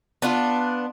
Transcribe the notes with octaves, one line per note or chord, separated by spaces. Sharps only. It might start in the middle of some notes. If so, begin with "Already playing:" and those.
B3 D4 F4